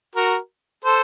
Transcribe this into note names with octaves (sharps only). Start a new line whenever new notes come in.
F#4 A#4
A4 C5